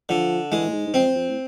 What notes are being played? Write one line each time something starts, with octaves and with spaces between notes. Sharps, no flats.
D3 F3
E3 G#3
A2
G#2
G#2
F2 C4
F2
A2